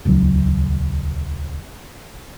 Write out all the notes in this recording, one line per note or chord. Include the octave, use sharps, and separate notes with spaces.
D#1 C#2 F#3